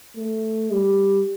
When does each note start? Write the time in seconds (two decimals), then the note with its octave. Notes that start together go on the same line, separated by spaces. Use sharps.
0.17 A3
0.71 G3